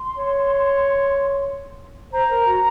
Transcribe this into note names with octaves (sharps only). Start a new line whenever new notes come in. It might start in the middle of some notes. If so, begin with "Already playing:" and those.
Already playing: C6
C#5
C5 A#5
A#4
F#4